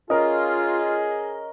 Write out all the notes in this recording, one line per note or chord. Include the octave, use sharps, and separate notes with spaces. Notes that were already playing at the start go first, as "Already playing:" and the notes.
C#4 F4 G#4 A#4 D#5